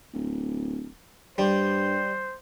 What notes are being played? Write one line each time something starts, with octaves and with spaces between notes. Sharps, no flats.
D1
G2 G3 C5